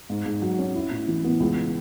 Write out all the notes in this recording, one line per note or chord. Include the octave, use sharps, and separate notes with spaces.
G#2
G#2
F#3
C#4
E4
A2
E3
B3
C#2